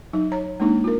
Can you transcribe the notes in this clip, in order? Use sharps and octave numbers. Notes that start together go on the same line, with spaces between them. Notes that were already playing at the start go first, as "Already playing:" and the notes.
F#3 D#4
C#5 A#5
G#3 A#3 D4 D#4
F4 A#4